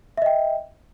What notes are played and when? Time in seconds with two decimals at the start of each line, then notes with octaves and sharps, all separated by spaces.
0.17 E5
0.22 D#5
0.26 G5